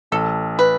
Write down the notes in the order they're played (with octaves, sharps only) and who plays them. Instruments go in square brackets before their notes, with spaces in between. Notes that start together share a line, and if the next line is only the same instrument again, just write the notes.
[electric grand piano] A1 [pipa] A4
[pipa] B4